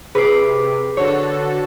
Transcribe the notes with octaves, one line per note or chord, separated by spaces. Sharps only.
C3 G#4 B4 D6 C7
D3 F#4 A4 C#5